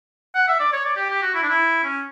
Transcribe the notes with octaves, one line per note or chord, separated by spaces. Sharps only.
F#5
E5
D5
C#5
D5
G4
G4
F#4
E4
D4
E4
C#4